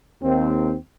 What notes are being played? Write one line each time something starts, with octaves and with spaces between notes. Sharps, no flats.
D#2 C4